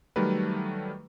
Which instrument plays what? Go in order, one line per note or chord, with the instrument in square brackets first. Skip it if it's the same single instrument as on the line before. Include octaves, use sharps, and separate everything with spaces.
[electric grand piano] D#3 F#3 G3 A3 A#4 B4